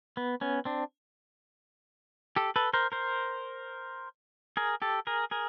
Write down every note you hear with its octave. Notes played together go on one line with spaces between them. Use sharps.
B3
B3 C#4
C4 D4
G4 A4
A4 B4
A#4 C5
A#4 C5
G#4 A#4
G4 A4
G#4 A#4
G#4 A#4